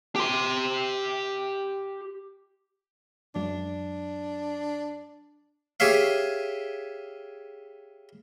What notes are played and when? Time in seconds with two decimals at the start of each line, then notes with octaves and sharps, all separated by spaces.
0.16 G4 C6
3.35 F#2 F#3 G#3 D4
5.80 G4 G#4 C#5 E5 F5